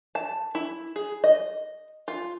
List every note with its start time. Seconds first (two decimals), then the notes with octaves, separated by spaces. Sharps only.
0.15 A5
0.55 E4
0.96 G#4
1.24 D#5
2.08 F4